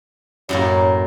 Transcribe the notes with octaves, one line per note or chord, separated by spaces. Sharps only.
F#2 A2 A#3 C#5